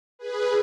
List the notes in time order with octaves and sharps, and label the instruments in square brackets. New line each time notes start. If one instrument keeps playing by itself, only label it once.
[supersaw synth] G#4 B4